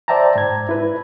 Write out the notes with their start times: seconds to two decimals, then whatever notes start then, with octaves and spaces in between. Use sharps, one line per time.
0.08 C5 D5 E5 G5 A5 A#5
0.35 G#2 G#6
0.69 E4 B4